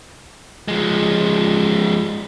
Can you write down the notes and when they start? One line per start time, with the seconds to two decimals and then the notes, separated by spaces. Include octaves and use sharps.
0.68 F3 G#3